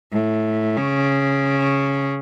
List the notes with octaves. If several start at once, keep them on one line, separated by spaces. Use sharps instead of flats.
A2
C#3